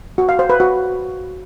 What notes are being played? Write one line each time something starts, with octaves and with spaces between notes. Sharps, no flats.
F#4
F5
C5
B4
F#4